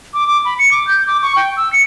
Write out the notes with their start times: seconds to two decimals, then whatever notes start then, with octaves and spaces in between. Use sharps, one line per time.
0.14 D6
0.28 D6
0.45 B5
0.59 C#7
0.71 D6
0.87 G6
1.07 D6
1.22 C#6
1.36 G5
1.57 E6
1.73 C#7